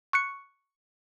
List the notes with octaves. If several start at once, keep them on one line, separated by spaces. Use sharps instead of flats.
C#6 F#6 C#7